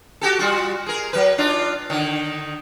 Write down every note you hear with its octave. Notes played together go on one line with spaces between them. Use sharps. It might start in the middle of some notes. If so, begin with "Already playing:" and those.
F#4 G4 A4
G3 F4 F#4
G#4 A#4
F#3 B4
D4 D#4 F4
D3 D#3